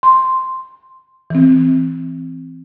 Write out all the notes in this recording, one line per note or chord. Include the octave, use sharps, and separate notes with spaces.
C6
E3 C4